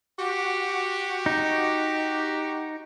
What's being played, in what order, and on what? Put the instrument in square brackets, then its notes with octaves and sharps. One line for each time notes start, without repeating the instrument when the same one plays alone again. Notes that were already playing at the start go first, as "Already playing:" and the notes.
[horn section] F#4 G4
[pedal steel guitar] D#4